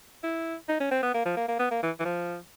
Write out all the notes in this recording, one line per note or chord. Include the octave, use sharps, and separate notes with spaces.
E4
D#4
C#4
C4
B3
A#3
F3
A#3
A#3
B3
A#3
E3
E3
F3